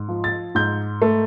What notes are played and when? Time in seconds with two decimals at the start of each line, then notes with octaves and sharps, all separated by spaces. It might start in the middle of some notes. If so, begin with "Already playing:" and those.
Already playing: G#2
0.08 F3
0.24 A6
0.55 G#2 G6
1.02 A3